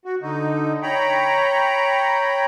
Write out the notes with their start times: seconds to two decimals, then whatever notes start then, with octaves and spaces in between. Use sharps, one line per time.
0.05 F#4
0.22 D3 D#4
0.82 C#5 G5 A#5 B5